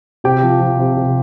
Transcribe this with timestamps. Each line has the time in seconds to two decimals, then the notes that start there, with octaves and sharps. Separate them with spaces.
0.24 C3 G4 G5
0.43 F3
0.60 F3
0.79 C3
0.97 C3